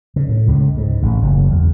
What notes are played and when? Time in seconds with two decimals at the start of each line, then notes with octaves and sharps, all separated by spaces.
0.16 C#3
0.29 A2
0.47 C#2
0.77 G#2
1.02 A1
1.22 F#1
1.51 E2